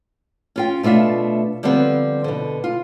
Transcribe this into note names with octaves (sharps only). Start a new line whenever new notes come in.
C#4 F4 G5
B2 A3 D4 F4 E5
D3 F3 G3 B3 C4
B2 D3
F4